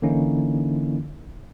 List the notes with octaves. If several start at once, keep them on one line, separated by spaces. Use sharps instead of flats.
D3 E3 A#3 C#4 D#4 E4